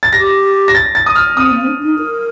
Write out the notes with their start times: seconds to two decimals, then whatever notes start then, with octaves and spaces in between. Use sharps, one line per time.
0.03 A6
0.13 G4 A#6
0.68 A#6
0.75 A6
0.95 A6
1.06 D#6
1.16 F6
1.36 C4 D#6
1.52 A#3
1.61 C4
1.67 D4
1.83 D#4
1.98 A#4